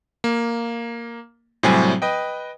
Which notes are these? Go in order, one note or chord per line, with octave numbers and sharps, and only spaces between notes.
A#3
A2 C3 F#3 G3 C4 G#5
B4 D#5 G5